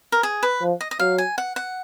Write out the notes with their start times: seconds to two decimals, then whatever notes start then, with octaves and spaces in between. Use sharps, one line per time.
0.12 A#4
0.23 G#4
0.43 B4
0.61 F3
0.81 D#5
0.91 D#5
0.99 F#3 F5
1.18 G#5
1.38 F#5
1.56 F#5